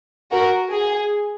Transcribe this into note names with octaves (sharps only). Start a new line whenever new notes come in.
F#4 A#4
G#4